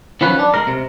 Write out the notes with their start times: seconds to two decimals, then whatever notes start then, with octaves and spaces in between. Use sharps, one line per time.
0.21 D#3 F3 F#3 C#4 B4
0.39 D4
0.54 G#3 A#4
0.67 C3